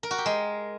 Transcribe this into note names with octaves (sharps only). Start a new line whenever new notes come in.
A#4
F#4
G4
G#3